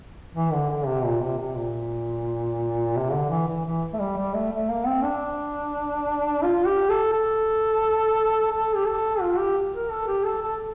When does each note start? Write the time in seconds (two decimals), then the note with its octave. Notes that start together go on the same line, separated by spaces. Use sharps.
0.35 E3
0.53 D3
0.70 D3
0.87 C3
1.05 A#2
1.21 C3
1.39 C3
1.57 A#2
2.96 C3
3.13 D3
3.30 E3
3.48 E3
3.65 E3
3.94 A3
3.99 G3
4.18 G3
4.35 A3
4.52 A3
4.69 A#3
4.87 C4
5.04 D4
6.43 F4
6.67 G4
6.90 A4
7.12 A4
8.52 A4
8.76 G4
8.86 A4
9.21 F4
9.38 G4
9.74 A#4
9.91 A4
10.08 G4
10.25 A4
10.42 A4